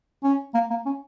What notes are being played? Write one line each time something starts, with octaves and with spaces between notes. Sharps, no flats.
C#4
A#3
A#3
C#4